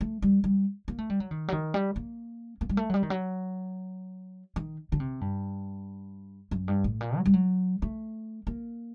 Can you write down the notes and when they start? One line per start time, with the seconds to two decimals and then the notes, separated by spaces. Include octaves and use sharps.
0.01 A3
0.22 G3
0.44 G3
0.88 A#3
0.99 A3
1.10 G3
1.20 F#3
1.31 D#3
1.48 F#3
1.53 D#3
1.74 G3
1.96 A#3
2.61 A#3
2.69 G3
2.77 A3
2.90 F#3
2.94 G3
3.03 D#3
3.10 F#3
4.56 D#3
4.92 D3
5.00 C3
5.21 G2
6.51 F#2
6.68 G2
6.84 A2
7.01 A#2
7.17 F#3
7.26 G3
7.34 F#3
7.82 A3
8.47 A#3